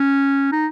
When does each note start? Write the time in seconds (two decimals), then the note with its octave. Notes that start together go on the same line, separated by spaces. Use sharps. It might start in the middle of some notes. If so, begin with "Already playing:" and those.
Already playing: C#4
0.52 D#4